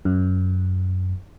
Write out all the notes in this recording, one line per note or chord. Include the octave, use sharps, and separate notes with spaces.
F#2